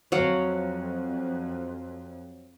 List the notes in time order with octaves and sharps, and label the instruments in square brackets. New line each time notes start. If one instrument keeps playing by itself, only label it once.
[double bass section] F2 [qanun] F#3 F5 F#5